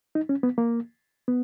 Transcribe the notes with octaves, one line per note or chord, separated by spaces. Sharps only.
D#4
C#4
B3
A#3
B3